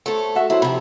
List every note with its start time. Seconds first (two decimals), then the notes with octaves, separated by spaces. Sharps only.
0.06 A3 A4 C5 C#5
0.35 F#4 E5 C#6
0.50 F#3 E4 C5
0.62 C3 F3 B5